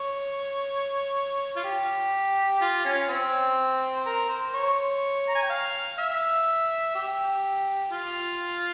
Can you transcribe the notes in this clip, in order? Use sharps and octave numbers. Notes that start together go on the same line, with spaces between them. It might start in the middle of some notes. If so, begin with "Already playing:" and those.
Already playing: C#5
F4
G4
F4
C#4
C4
C5
A#4
C5
C#5
A#5
G#5
G5
F5
E5
G4
F4